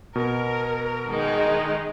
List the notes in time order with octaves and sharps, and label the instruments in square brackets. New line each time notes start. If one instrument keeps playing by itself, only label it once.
[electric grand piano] B2 [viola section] A#4
[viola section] D#3 G#3 D#4